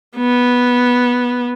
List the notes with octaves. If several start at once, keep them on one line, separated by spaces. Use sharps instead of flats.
B3